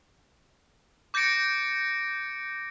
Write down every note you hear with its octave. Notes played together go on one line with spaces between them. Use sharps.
D6 G6 A6 A#6 C#7 D7